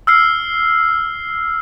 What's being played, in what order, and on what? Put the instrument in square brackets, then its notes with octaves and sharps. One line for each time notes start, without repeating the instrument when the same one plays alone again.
[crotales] E6 F6 C7